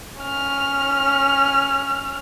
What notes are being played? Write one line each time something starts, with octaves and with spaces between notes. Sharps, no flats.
C#4 F6